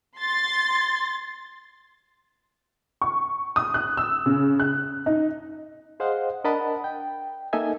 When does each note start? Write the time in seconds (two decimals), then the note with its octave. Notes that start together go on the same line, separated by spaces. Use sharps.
0.19 C6 A6
3.02 C#6
3.56 D#6
3.74 F#6
3.97 E6
4.26 C#3
4.60 F#6
5.06 D#4
6.00 G#4 C5 D#5 F5 F#5
6.44 D4 A#4 D#5 F#5 A5 B5
6.84 G5
7.53 A#3 D#4 A4 D#5 E5 G#5